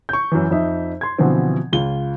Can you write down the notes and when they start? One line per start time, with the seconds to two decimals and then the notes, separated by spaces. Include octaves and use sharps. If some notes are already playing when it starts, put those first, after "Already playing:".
0.09 C#6 G6
0.32 F#2 E3
0.51 F2 D#4 E5
1.01 C6 G#6
1.19 B2 D3 E3 F3 C4
1.72 C#2 F4 G7